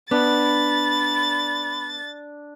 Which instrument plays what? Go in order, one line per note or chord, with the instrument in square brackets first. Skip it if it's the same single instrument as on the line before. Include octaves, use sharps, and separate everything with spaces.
[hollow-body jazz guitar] B3 [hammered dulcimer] D4 [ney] B5 [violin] A6